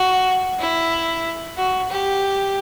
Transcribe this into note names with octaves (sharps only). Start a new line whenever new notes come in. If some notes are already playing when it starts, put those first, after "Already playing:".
Already playing: F#4
E4
F#4
G4